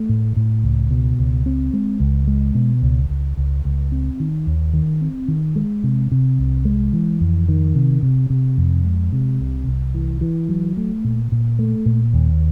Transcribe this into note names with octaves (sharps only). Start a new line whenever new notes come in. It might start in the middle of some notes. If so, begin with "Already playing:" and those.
Already playing: A3
A2
A2
C#2
B2
C#2
C4
G#3
C#2
G#3
B2
C#2
C#2
C#2
C#2
C4
D#3
D#2
D#3
C4
D#3
G#3
C3
C3
C2
G#3
E3
F2
D#3
C3
C3
C3
F2
G#3
C3
C2
C2
E3
E3
F#3
A3
A#2
A#2
A3
A#2
D#2